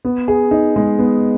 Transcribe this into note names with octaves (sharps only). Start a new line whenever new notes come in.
B3
G#4
D#4
G#3
B3